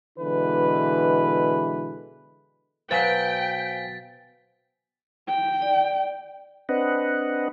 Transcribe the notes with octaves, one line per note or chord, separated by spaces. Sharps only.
B2 D3 E3 G#3 B4
B2 F#3 C5 F5 G5 G#5 A6 B6
G5
D5
C4 D4 B4 D#5 F#5